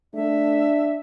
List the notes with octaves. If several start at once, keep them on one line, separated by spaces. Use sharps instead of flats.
A3 D4 E5